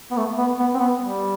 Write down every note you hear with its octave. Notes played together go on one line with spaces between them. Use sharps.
B3
A3
B3
B3
C4
B3
G3